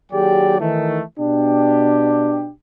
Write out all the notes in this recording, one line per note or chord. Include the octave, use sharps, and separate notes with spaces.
D#2 F#3 G4 G#4 D5 G5
D#3 E3 A3
B2 D4 G4